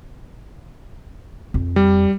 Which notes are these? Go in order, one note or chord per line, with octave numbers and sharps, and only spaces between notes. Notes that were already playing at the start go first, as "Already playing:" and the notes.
F2 C4
G3